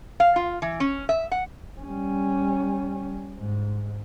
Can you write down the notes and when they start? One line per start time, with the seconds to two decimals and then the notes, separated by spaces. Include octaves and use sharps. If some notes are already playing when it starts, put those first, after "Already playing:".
0.20 F5
0.36 F4
0.62 E3
0.80 C#4
1.09 E5
1.31 F#5
1.81 G3 C#4
3.38 G#2